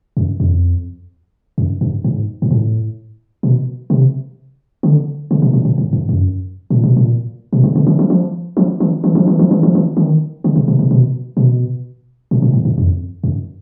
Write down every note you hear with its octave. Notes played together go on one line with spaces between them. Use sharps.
F#2
F2
F#2
G2
G#2
G#2
A2
B2
C3
D3
C#3
B2
A#2
A2
G#2
G2
F#2
A#2
B2
A#2
B2
C3
C#3
D#3
F3
F3
F3
E3
E3
F3
E3
F3
E3
F3
E3
D#3
D3
C3
B2
B2
B2
B2
A#2
A#2
G#2
G2
F2
F#2